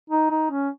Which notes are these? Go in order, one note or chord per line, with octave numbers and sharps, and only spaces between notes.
D#4
D#4
C#4